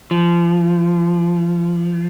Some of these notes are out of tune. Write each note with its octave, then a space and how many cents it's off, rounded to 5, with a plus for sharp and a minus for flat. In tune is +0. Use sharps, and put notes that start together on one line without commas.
F3 -25